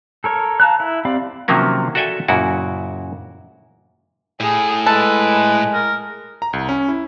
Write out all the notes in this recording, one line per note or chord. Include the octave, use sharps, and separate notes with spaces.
A4 A#4 C#5
F5 A5 A#5 F#6
E4
C4 G4 D5 F5 B5
C3 D#3 F3 F#3 A#3 C#4
F#4 A4 D5 E5 G5 G#5
F#2 A#2 C#3 E4 F#4
A2 G#4
G#3 A4 B4
A#4
A#5
C2
C#4
E4